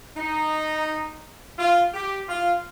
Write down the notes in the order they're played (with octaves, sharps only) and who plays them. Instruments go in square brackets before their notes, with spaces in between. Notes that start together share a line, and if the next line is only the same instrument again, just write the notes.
[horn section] D#4
F4
G4
F4